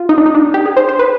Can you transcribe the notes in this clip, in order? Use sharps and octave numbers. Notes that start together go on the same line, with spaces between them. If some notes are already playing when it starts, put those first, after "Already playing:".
Already playing: F4
D#4
D4
D#4
D4
G4
G#4
C5
C5
B4